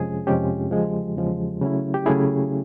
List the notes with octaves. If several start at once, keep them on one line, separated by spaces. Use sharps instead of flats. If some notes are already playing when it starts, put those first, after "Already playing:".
Already playing: F2 C3 F3 G#3 C#4 G#4
F2 C3 F3 G#3 C#4 G4
E2 C#3 F3 G#3
E2 C#3 F3 G#3
C#3 F#3 A3 C#4 E4
G4
C#3 F#3 A3 C#4 E4 G#4